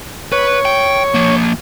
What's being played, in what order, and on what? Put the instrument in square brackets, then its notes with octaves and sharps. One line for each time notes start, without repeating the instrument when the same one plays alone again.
[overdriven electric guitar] B4 [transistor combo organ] C#5
[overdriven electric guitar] G5
F3 A#3